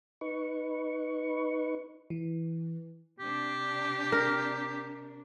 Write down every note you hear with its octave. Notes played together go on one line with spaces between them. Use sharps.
D#4 B4 C#6
E3
C3 D4 G4
A#4